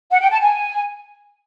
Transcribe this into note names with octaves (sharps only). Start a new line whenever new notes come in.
F#5
G5
A5
G#5